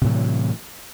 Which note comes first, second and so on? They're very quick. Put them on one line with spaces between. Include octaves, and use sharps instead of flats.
C3 A2 F#3 E3